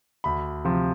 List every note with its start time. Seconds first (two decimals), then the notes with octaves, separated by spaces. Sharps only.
0.24 D2 B5
0.65 C3 F3